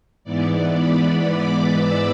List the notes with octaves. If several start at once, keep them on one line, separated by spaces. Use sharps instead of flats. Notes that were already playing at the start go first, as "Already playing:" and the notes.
G#2 E3 B3 D5
B5
D6
E6